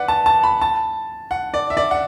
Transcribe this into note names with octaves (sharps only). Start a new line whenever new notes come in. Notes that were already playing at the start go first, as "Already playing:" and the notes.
Already playing: B4 D5 F#5
A5
A5
B5
A5
F#5
D5
E5
D5
F#5